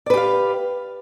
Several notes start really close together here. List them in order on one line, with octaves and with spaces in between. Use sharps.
D5 B4 G4 F5